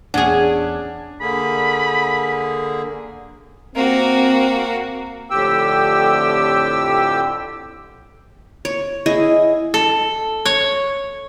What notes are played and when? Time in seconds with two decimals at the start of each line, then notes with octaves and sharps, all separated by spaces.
0.14 E2 C#4 D4 G#4 F#5 G#6
1.21 D3 A#3 G#4 B5
3.75 A#3 C4 F#4
5.30 F2 A2 D3 G4 G5 E6
8.65 C#5
9.06 E4 G#4 D#5 G#5
9.74 A4
10.45 C#5